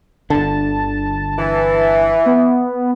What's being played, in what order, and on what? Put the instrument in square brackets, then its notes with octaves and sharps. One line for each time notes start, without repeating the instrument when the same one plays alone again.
[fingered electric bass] G1 D3 [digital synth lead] A5
[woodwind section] E3
[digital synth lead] B3